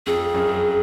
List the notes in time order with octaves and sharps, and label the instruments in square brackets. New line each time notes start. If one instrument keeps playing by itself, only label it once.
[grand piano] F2 [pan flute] G#4
[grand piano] F#2